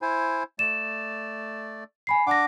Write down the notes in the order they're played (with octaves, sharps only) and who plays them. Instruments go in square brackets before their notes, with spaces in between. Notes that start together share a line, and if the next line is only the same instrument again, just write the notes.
[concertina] E4 C5 G#5
[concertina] A3 D5 [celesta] E7
[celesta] G#5 B5 C7
[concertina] D4 D6 [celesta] F#5 A#6